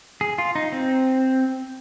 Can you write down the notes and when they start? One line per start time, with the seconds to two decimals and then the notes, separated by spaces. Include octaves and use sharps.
0.21 G#4
0.38 F4
0.55 D#4
0.72 C4